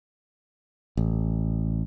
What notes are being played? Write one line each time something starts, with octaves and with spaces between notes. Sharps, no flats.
A1